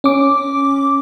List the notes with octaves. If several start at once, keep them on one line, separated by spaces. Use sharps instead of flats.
C#4 D6